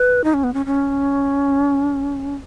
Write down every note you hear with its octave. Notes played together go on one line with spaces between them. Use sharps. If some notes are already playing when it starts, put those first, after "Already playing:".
Already playing: B4
D#4
C#4
B3
C#4
C#4